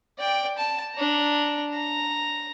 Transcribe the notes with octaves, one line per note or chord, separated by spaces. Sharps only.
D5 G5
A5
D4 A#5
A#5